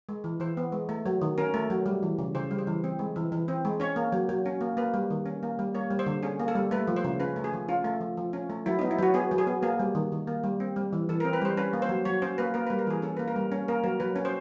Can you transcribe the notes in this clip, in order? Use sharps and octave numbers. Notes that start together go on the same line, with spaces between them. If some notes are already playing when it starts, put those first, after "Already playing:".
G#3
E3
E3 C5
B3
G#3
A3
F#3
D#3
C#4 A#4
A3
F#3
G3
E3
C#3
C#3 C5
G3
C5
E3
C4
G#3
E3
E3
C4
G#3
C#4 C#5
A#3
F#3
F#3
C#4
A#3
A#3 B4
G3
D#3
C#4
A#3
G3
A#3 C#5
G3
C5
D3
C#4 G#4
A#3
A4
G3
A3 B4
F3
C5
C#3
C#4 B4
A3
G#4
F3
C#4 F4
A3
F3
F3
C#4
A3
F#3 E4
B3 D#4
E4
F#3 F#4
B3 G#4
F#3
G#4
B3
A#3 G#4
G3
D#3
D#3
A#3
G3
C4
G3
E3
E3 A4
C4 A#4
B4
G3 C5
C#4 B4
A#3
C5
F#3
F#3 C#5
C#4 C5
A#3 B4
A#3 A#4
G3 B4
A#4
E3 G#4
C#4 A4
A#3 B4
A#4
G3
C#4
A#3 A#4
F#3 A#4
F#3 B4
C#4
C5